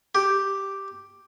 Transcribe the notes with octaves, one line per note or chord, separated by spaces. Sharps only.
G4